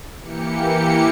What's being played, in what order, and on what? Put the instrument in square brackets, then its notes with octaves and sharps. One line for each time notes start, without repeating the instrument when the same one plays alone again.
[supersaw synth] E3 A#3 G4 C#7